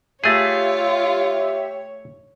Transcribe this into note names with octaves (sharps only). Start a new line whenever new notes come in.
A3 F4 G4 G#4 C#5 E5